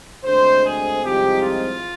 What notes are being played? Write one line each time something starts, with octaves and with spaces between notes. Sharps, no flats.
D2 D3 G#3 C4 C5
G#4
C2 C3 F3 G#3 D#4 G4
F4